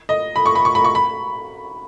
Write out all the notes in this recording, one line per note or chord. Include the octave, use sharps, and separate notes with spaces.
D#5
B5
C#6
B5
C#6
B5
C#6
B5